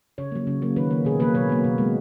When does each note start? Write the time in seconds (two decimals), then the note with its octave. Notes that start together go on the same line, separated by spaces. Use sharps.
0.18 C#3 C#5
0.32 F#3 A#3
0.47 C#3
0.62 F#3 A#3
0.76 D#3 B4
0.91 A#3
1.05 B2 G#4
1.20 F#3 A#3 B4
1.35 B2 C#5
1.49 F#3 A#3
1.64 B2
1.78 G#3